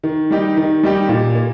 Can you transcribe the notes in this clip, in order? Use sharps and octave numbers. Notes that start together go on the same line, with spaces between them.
D#3
G3 D#4 G4
D#3
G3 D#4 G4
A#2
A#3